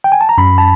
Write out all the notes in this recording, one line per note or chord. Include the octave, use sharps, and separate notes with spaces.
G5
G#5
A5
A#5
F#2 B5
A5